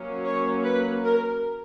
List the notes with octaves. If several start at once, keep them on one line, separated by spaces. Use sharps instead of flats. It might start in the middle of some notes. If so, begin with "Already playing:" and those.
Already playing: F#3 A#3 C#4
C#5
B4
A#4